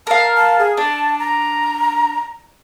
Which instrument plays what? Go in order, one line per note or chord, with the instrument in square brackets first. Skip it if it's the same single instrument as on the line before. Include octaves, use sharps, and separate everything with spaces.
[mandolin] A#4 F5 [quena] A5
[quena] A5
G#4
[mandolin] D4 [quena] A5
[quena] A#5